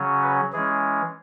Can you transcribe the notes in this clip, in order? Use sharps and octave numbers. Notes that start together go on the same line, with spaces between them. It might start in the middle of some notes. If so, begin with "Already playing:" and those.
Already playing: C#3 F#3 C#4
B4
E3 G#3 C#4 G#4